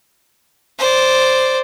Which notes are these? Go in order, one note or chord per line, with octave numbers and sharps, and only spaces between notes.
C5 D5